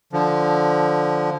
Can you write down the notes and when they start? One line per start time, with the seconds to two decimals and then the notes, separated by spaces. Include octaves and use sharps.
0.13 D3 F3